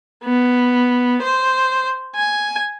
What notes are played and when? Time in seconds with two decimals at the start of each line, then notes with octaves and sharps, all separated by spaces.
0.24 B3
1.22 C5
2.15 G#5